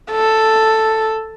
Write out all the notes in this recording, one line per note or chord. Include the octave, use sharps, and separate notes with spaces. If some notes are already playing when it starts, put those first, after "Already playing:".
A4